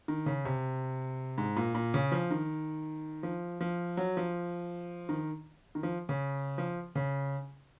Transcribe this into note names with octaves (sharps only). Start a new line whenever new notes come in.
D#3
C#3
C3
G#2
A#2
A#2
C#3
F3
D#3
F3
F3
F#3
F3
D#3
D#3
F3
C#3
F3
C#3